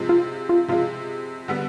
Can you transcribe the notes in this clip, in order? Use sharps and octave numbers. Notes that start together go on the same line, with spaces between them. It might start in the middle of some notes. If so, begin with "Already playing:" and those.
Already playing: C3 F3 G#3
F4
F4
C3 F3 G#3 F4
D3 G3 B3